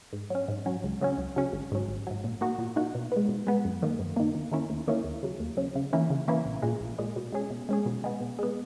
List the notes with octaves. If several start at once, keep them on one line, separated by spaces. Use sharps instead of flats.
G#2
F#3 C#4
G#2
F#3 C#4
C#2
C#3 F#3 C#4
C#2
C#3 F#3 C#4
G#1
G#2 F#3
G#1
G#2 F#3
A#2
A#3 D#4 F#4
A#2
A#3 D#4 F#4
B2
G#3 B3
B2
G#3 B3
F#2
D#3 A#3
F#2
D#3 A#3
D#2
D#3 A#3 C#4 E4
D#2
D#3 A#3 C#4 E4
D#2
C#3 F#3
D#2
C#3 F#3
C#3
E3 A#3 C#4 E4
C#3
E3 A#3 C#4 E4
A#1
A#2 G#3
A#1
A#2 G#3
B2
G#3 C#4 G#4
B2
G#3 C#4 G#4
B2
G#3 B3
B2
G#3 B3